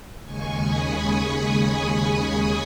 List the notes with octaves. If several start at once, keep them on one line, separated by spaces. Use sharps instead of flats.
D#2 C#3 G#3 G#5 C#6
B5 D#6
G#5 C#6